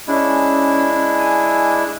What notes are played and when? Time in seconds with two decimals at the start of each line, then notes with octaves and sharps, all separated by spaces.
0.07 G#3 C#4 D4 E4
1.13 G#5